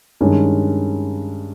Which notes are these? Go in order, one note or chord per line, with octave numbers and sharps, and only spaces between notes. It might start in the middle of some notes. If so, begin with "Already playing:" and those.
G2 D#3 G#3 C#4